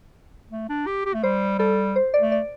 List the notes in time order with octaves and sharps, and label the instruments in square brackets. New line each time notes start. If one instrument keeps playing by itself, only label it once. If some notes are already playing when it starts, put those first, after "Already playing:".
[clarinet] A3
D4
G4
G4
A3
[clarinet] G3 [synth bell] C5
[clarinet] G3 [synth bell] A4
[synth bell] C5
D5
[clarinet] A3
[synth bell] D5